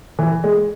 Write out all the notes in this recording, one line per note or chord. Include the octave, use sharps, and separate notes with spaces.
E3
G#3